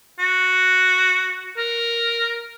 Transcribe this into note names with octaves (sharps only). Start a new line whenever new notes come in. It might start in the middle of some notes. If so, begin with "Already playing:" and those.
F#4
A#4